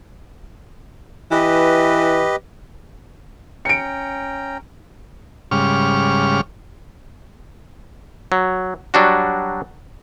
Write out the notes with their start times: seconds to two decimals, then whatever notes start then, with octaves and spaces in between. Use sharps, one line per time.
1.31 E3 G4 B4 D#5
3.65 C#4 G5 A#5 C#7 D7
5.51 G#2 C#3 G3 C#6 D6 F6
8.32 F#3
8.94 F#3 G3 D4 F#4